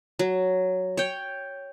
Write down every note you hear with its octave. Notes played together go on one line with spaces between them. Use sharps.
F#3
C#5 G5